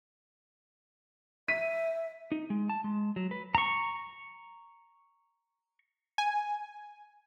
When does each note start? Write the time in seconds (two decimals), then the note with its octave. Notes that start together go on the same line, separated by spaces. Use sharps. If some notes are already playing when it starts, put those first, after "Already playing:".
1.48 E5 B6 D#7
2.32 D#4
2.50 G#3
2.69 A5
2.84 G#3
3.16 F#3
3.31 B4
3.55 A#5 C#6
6.18 G#5